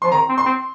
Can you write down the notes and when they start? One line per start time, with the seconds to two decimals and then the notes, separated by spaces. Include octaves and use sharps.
0.02 F3 C6
0.12 D#3 A#5
0.29 C4
0.38 C6
0.45 C4